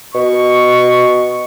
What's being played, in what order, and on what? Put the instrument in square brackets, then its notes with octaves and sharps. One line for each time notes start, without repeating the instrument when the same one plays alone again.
[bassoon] B2 [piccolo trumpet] C#6